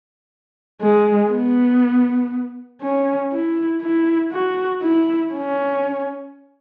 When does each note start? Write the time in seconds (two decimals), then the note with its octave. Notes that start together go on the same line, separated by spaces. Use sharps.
0.82 G#3
1.31 B3
2.82 C#4
3.32 E4
3.82 E4
4.32 F#4
4.82 E4
5.33 C#4